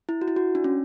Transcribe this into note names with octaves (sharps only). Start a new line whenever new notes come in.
E4
F#4
E4
F#4
D4
C#4